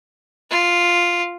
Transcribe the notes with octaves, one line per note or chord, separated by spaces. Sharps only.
F4